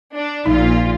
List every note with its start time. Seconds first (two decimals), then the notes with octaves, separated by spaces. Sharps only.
0.15 D4
0.46 A#1 A#2 D#4 F4